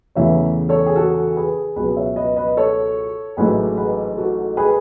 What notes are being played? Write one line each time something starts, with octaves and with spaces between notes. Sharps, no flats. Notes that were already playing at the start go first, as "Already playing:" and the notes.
E2 C#3 E3 A3 C#5 E5
A4 C#5
G#4
F#4 A4
G#4 B4
C#2 B2 F#3 G#4 B4
C#5 E5
B4 D#5
B4 D#5
A4 C#5
A1 G#2 F#3 A3 G#4 B4
G#4 B4
F#4 A4
G#4 B4